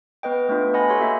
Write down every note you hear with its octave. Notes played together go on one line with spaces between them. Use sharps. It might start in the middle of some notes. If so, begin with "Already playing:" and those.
B3 B4 D#5 G5
A3 B3 D4 F4 B4
D#5 F#5 G#5 B5 A#6
F#4 G4 A4 C#5 F#5 C6
A#3 F#4 E5 A#5